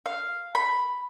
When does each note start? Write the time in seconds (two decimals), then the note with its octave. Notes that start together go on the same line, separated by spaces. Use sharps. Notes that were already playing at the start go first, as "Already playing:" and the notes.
0.06 F5
0.55 B5